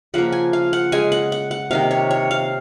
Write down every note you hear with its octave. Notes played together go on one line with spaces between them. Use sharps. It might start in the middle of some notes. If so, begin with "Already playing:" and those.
C#3 F3 A#3 F#5
G#5
F5
F#5
C#3 G#3 G#5
F#5
F#5
F#5
C3 D#3 A#3 F5
C#5
C#5
F5